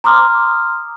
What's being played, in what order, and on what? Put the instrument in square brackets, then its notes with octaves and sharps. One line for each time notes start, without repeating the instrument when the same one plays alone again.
[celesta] A#5 C6 D6 D#6 F6